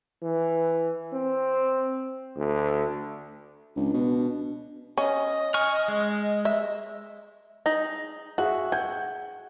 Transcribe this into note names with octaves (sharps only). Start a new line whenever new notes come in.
E3
C4
D2
C#2 D4
B2
C#4 D#5
G#5 C#6 F6
G#3
E5
D#4 G#4
F#4 G#4 E5
F#5 G#5 G6